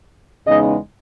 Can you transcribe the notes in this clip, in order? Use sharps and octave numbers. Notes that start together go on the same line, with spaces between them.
E2 C#3 G#3 B3 D#4 D#5